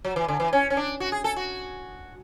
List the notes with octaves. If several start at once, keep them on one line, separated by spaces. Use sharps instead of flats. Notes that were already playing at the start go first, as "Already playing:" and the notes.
F#3
E3
D3
E3
C#4
C#4
D4
F#4
G#4
A4
F#4